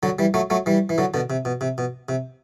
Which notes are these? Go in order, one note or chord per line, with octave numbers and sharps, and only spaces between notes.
D3 F#3
E3 G3
F#3 A3
F#3 A3
E3 G3
E3
D3 F#3
B2 D3
C3
B2
C3
B2
C3